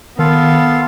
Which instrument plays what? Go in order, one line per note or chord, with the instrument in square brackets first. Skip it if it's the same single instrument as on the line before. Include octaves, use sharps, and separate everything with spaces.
[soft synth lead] D#3 [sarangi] B3 [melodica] F4 A4 F5